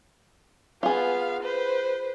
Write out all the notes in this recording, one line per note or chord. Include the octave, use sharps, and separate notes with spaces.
B3 F4 G#4 F5
B4 C5